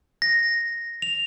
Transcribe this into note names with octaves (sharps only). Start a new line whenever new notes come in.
A#6
F7